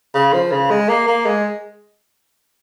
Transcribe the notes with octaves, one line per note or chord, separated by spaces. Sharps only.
C#3
F3
C#3
G#3
A#3
A#3
G#3